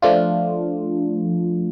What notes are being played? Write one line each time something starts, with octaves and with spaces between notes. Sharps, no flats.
F3 A3 D4 F4